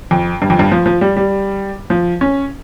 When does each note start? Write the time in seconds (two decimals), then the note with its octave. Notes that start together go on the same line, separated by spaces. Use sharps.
0.11 F2
0.42 G2
0.50 F2
0.59 G2
0.72 F3
0.86 F3
1.01 G3
1.17 G3
1.90 F3
2.21 C#4